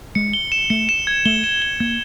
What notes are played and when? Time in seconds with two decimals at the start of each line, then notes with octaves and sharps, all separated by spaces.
0.15 G#3 C#7
0.33 G7
0.52 E7
0.70 A3 C#7
0.89 E7
1.07 G#6
1.26 A3 G7
1.44 E7
1.62 G7
1.80 A#3 G#6